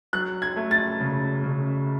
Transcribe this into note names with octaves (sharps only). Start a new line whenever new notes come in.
F#3 F#6
G#6
A3
A6
C#3
C#3